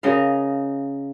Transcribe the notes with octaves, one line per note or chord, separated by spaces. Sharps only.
C#3 A#4 D#5 F5